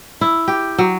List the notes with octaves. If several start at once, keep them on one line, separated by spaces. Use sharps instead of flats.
E4
G4
F#3